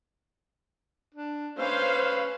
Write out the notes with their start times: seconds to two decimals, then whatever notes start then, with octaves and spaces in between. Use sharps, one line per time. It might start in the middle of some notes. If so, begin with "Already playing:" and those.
1.14 D4
1.58 C#4 B4 C5 F5